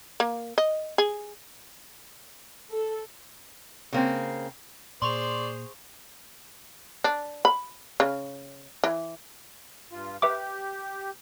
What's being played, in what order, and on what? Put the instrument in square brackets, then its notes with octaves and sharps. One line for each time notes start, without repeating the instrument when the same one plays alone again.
[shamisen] A#3
D#5
G#4
[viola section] A4
[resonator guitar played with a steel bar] C#3 A#3 C4
[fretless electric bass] A#2 [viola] G#4 C5 [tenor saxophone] D5 [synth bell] C6 C#6 F7
[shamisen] D4
B5
C#3
E3
[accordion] G2 F4
[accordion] G4 [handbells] B4 E5 D6